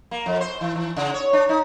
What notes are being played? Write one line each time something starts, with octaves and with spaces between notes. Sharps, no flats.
A#3
F2
C5
E3
E3
C#3
C#5
D4
D#4